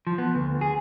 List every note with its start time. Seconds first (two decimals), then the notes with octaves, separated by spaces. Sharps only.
0.07 F3
0.18 B3
0.35 D2
0.61 G#4